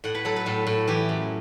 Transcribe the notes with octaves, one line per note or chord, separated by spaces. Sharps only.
A2 F#5
B4
F#3 A4
B4
A2 A4
A2
E3 G4
F#2